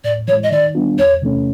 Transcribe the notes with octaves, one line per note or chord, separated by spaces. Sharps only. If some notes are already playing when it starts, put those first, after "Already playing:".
A2 D5
E3 G#3 C#5
D#5
D#3 D5
G3 B3 D4 F4
E2 C#5
C3 E3 A3 C#4